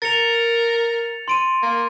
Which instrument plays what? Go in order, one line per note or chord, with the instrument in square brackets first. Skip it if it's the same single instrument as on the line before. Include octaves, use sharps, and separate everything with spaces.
[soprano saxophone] A#4 [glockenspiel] A6 C#7 F7
[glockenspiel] C6 D7 D#7
[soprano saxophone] A#3